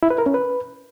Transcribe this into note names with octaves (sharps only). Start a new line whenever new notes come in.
E4
B4
A#4
C#4
B4